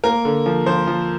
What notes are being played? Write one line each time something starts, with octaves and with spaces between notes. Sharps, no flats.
A#3 A#4
D3
F3
F3 C5
F3